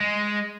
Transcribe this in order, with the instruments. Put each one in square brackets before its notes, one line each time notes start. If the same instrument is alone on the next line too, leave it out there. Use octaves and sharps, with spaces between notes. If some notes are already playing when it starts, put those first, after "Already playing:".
[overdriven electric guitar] G#3